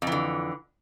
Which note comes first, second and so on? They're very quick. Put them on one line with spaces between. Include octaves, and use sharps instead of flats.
F2 E3 D3